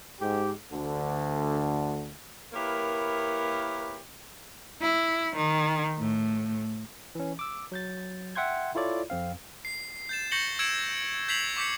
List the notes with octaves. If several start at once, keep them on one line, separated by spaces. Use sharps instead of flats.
G#2 G4
D2 D3
A#3 E4 G4 A#4 B4 C#5
E4
D#3
A2
E3 C#4
D6 E6
F#3 G6 A6
E5 F#5 G5 C6 G6 G#6
E4 F4 A4 C#5 D5
F2 C4 F5
C7
G6 A6 E7
C#6 G6 A#6 C#7 F#7 G7
E6 G#6 C#7 D7 E7 F#7
G6 G#6 B6 C7 F7 F#7
C#6 D6 G6 B6 C#7